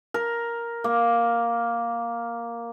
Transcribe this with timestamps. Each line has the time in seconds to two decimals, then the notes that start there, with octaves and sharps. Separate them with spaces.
0.14 A#4
0.84 A#3